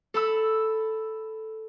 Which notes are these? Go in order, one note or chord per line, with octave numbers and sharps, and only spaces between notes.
A4 B5 E6